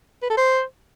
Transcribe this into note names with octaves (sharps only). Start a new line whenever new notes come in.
B4
A4
C5